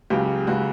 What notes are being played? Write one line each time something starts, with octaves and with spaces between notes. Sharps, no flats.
C#2 C#3 F#3 G4
C#2 C#3 F#3 F#4